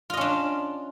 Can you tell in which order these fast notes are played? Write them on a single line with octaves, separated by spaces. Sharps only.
F4 D#5 C#4 D4